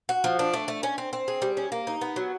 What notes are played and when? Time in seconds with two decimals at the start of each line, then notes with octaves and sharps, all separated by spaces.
0.09 F#4
0.24 F3
0.39 D4
0.53 A3
0.68 A3
0.83 C#4
0.98 C4
1.13 C4
1.28 G#4
1.42 G3
1.57 C#4
1.72 A#3
1.87 D#4
2.01 B3
2.16 F#3